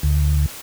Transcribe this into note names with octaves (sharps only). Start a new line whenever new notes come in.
D2